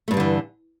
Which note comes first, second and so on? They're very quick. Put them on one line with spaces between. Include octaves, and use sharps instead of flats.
A3 G2 G3 D3 E3